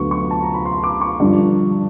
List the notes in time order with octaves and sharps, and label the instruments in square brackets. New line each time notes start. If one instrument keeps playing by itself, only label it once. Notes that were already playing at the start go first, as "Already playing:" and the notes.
Already playing: [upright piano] D2 D3 F#3 B3 C#6
C#6
A5
A#5
B5
C6
D6
C#6
G2 D3 F3